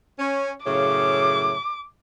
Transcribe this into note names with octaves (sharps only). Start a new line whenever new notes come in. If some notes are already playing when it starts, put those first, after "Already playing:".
C#4
F#2 A2 C#3 D6